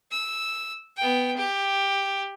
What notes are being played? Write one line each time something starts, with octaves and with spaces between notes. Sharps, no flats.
E6
B3 G5
G4